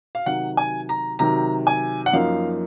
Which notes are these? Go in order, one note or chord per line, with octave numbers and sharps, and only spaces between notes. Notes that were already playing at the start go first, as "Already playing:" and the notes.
F5
C3 D#3 F#3 F#5
G#5
A#5
C3 D#3 F#3 A#5
G#5
F#5
F#2 F3 A#3 D#4 F5